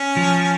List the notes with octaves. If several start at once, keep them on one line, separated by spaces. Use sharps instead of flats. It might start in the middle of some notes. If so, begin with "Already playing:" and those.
Already playing: C#4
F3